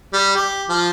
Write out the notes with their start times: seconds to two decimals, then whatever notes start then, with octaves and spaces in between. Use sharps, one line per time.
0.13 G3
0.35 G4
0.69 F3